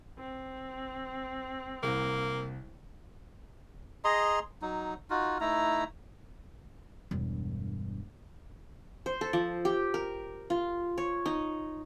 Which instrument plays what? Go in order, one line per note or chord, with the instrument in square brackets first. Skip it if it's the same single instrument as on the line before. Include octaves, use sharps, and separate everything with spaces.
[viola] C4
[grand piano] C2 [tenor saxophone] A#3
[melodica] G#4 D#5 A#5 C6
F#3 D#4
D#4 F4 F#4
A3 D#4 E4 A#5
[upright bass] E1 G2
[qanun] C5
A4
F3
G4
A#4
F4
C#5
D#4